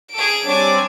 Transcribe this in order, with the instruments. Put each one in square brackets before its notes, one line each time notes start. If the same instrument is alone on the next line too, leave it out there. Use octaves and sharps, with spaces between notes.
[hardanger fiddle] G#4 A4 [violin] D7
[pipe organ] G3 C4 D5 [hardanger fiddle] D4 G#5 [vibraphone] C#5 C#6